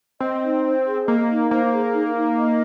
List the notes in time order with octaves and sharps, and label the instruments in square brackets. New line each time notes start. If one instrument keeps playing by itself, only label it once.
[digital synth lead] C4 [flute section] D#5
[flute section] D#4
C5
G#4
[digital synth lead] A#3 [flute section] D#5
[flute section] D#4
[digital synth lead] A#3 [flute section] C5
[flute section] G#4
D#4
D#4
D#5